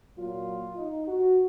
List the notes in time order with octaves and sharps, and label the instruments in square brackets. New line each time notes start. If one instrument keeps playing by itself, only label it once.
[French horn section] A#2 F#3 A#3 F4
D#4
F#4